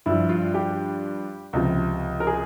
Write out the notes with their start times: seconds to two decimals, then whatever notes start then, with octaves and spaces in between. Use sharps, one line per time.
0.06 G2 F3 E4
0.29 F4
0.54 G4
1.53 C#2 C3 F3
2.20 A#4
2.27 G#4